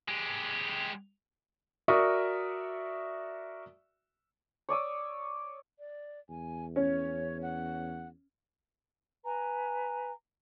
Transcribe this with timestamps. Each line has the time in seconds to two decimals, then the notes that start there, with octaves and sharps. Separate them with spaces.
0.08 G#3 G4
1.88 F#4 A#4 D5 E5 C#6 D#6
4.69 C#5 D5 D#6 E6
5.79 D5
6.30 E2 G#5
6.76 C#4 C#5
7.42 F#5
9.24 B4 G#5 A#5